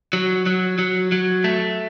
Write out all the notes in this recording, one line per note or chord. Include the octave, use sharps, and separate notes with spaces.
F#3
F#3
F#3
F#3
A3